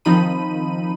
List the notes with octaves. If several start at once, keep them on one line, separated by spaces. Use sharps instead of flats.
D#3 F3 C4 D#4 B5 D#7